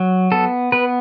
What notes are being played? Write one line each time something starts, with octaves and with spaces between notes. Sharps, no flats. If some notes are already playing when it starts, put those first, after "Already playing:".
Already playing: F#3
B3 A4
B3 B4